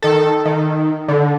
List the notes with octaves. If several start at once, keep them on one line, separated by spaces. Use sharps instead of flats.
D#3 A4
D#3
D3